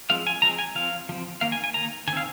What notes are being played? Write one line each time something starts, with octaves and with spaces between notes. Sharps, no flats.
F3 G#3 C4 F5
G#5
F3 G#3 C4 A#5
G#5
F3 C4 F5
F3 C4
D#3 A#3 F5
G#5
G#5
D#3 A#3 A#5
D#3 G#5
C4 F5